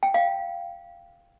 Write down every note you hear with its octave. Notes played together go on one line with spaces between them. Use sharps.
G5
F5